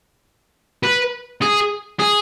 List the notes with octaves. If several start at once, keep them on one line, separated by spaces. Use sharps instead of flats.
B4
G#4
G#4